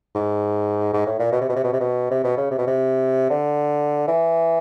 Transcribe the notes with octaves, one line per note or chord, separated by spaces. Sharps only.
G#2
G#2
A2
A#2
B2
C3
B2
C3
B2
C3
B2
C3
B2
C#3
C3
B2
C3
D3
E3